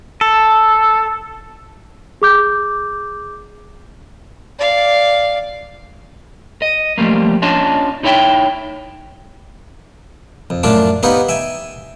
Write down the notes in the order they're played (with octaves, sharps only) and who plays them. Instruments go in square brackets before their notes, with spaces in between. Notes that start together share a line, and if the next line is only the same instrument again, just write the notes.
[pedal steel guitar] A4
[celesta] G#4 D6 G6
[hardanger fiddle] D5 F5
[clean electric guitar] D#5
F3 G3 A3 A#3
C#4 D4 F4 C#5 D#5 A5
D#4 E4 C#5 E5 G5
[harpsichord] F2
F#2 A2 D4 F4 A5 D6
B3 D#4 G4 B4 C#5 F5
E5 G5 G#5